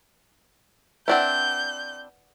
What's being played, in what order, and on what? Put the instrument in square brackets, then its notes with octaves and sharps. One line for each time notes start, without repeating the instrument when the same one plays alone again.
[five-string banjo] C4 D4 E4 [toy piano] B4 D5 F#5 [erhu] G6